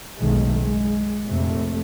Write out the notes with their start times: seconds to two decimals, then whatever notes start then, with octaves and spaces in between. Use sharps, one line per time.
0.17 F#1 B1 B2 D#3 G#3 A3
0.57 G#3
1.24 F1 A#1 F2 C3 A3